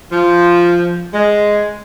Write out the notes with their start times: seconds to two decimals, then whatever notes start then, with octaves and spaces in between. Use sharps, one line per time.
0.11 F3
1.13 G#3